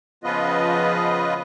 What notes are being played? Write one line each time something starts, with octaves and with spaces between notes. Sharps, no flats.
C#3 F3 B3 F4 B4 D#5